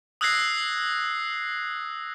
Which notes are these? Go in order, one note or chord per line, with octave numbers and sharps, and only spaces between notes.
D#6 E6 F#6 G#6 A#6 C7